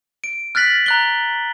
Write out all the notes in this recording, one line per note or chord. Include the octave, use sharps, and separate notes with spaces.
D7
F6 F#6 A6 B6 F#7
A#5 F#6 G7